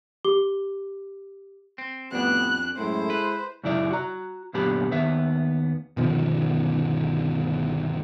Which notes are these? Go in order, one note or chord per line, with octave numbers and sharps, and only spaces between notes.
G4 D6 G7
C4
F2 A2 G3 B3 D4 F#6
F#2 A2 G#3 E4 A4 C5
B4
F#2 C#3 E4 D5 E5
F#4 A#5
F#2 A#2 D3 B3 G4 B5
D#2 B3 E5
G1 B2 D#3 F3